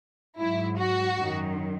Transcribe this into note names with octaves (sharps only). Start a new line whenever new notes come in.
G#2 F#3 E4
F#4
F#2 D#3 F#3